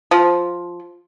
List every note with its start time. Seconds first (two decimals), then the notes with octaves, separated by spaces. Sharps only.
0.11 F3